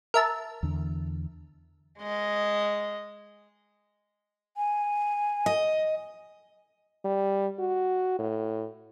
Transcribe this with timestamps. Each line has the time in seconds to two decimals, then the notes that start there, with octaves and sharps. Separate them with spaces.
0.14 A#4 E5 A5
0.63 E2 D3
1.99 G#3 D#5
4.57 G#5
5.46 D#5
7.05 G3
7.59 F#4
8.19 A2